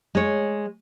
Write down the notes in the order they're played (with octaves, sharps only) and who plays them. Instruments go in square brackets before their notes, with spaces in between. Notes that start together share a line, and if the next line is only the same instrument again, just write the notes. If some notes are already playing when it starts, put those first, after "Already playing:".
[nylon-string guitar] G#3 C#5